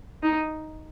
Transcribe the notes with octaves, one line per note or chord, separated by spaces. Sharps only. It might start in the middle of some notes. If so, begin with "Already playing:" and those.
D#4